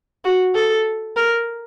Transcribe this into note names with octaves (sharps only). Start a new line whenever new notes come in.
F#4
A4
A#4